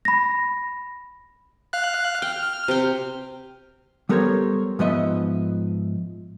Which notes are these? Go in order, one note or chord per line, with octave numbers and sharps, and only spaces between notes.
B5 A#6
F5 F#6
G5 F6
C3 G5
G3 B3 A4 A#4 C5 C#5
G#2 F3 B3 D#5 E5